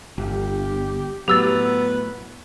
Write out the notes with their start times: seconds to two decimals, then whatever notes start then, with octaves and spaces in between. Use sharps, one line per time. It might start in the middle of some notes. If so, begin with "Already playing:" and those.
0.18 G1 G4
1.28 A2 F#3 B3 G4 E6 A6